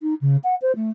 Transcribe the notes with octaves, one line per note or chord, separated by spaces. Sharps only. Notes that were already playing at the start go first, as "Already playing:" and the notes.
D#4
C#3
F#5
C5
A3